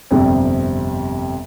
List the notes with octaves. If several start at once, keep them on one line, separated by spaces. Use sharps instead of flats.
G1 F2 C3 G3